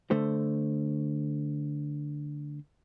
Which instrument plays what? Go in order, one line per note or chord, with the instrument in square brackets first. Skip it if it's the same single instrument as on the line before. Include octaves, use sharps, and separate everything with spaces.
[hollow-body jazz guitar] D3 A3 C5